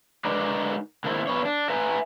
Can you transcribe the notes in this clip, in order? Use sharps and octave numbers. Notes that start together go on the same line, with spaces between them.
D3 G#3 D#4 A#4 B4 D5
D3 D#3 A3 A#3 C4 E4
E2 B3 C#5
D4
B4 E5 G#5 A#5